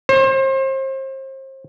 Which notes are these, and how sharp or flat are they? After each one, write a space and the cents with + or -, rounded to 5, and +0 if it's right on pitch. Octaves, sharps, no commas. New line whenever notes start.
C5 +35